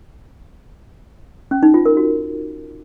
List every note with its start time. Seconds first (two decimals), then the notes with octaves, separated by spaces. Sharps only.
1.51 C#4
1.63 D#4
1.74 F4
1.85 A#4
1.97 F#4